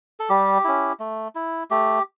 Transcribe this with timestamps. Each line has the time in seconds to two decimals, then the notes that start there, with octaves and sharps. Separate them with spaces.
0.20 A4
0.29 G3 G4
0.64 C#4 E4
1.00 A3
1.35 E4
1.71 A3 G4